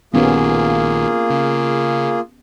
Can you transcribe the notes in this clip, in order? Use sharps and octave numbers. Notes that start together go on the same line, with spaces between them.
A#1 D#3 A#3 B3 C#4 F4 G4 G#4
C#3